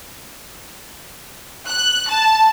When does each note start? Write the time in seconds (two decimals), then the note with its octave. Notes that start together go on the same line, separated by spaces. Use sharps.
1.68 F#6
2.09 A5